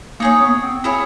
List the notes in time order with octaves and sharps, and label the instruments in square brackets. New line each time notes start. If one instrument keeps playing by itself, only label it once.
[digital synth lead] A#3 [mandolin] D#4 G#4 C#5
[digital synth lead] B3
C4
[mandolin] E4 G#4 C#5 F5